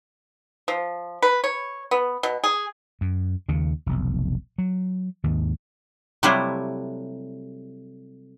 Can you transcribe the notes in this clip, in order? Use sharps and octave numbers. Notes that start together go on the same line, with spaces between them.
F3
B4
C#5
B3
B2
G#4
F#2
D#2 C#3
F1 B1
F#3
D#2 G#2 D#3
C3 F#3 G3 A3 E4 F4